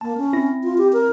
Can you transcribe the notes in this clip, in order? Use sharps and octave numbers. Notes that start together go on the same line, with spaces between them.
A#3 A5
C#4
C4 E4 A#6
F4
G4
A#4